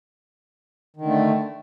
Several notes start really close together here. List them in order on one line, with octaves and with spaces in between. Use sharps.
D#3 D3 A3